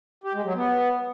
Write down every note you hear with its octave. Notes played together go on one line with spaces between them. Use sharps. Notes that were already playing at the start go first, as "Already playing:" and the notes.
G4
G#3
F#3
B3